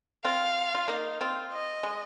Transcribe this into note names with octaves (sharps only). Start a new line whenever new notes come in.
C4 F4 F5
F4
A#3 D#4
C4 F4
D#5
G#3